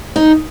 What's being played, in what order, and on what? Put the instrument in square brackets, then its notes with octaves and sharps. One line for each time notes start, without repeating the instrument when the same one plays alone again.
[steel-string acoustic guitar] D#4